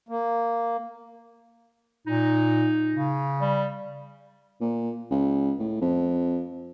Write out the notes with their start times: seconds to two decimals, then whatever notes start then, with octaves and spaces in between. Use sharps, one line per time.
0.09 A#3
2.07 A#2 D#4
2.94 C#3
3.41 G3
4.61 A#2
5.11 C#2
5.59 A2
5.81 F2